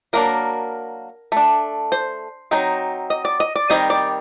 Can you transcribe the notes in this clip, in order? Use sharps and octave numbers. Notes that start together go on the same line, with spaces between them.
F#3 A#3 D4 A#4
A3 D4
C5
F#3 A3 C4 D#4
D#5
D5
D#5
D5
D#3 G3 C4 D#5
D5